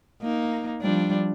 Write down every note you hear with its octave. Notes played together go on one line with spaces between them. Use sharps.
A#3 D#4
F3 G3 D4